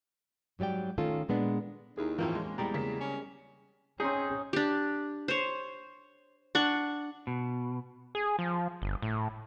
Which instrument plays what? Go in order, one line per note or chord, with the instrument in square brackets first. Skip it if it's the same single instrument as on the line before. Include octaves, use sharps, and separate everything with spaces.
[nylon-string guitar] G#2 F#3 G3 D5 G5
D#3 A3 C#4 F4 A4
A#2 G#3 B3 D4
[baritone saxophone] D#2 [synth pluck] D#4 E4 G#4
[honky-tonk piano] F2 A2 F3 [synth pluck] E3 F4 [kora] A#3 C4 C#4
[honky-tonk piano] G#3
[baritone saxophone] E2 [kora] G3 G#3 D5 [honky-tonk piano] G4 [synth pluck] A#5
[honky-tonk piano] C#3 A#3 B6
[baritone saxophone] C#4
[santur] C4 D#4 [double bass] C#4 [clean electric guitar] G#4
[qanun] D4 G4
C5 C#5
D4 F#5 C#6
[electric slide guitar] B2
[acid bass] G#4
F3
G1
A2